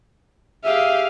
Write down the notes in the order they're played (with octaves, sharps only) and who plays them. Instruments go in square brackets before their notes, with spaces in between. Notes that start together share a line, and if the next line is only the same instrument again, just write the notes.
[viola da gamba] G4 G#4 [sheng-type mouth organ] E5 [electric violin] F5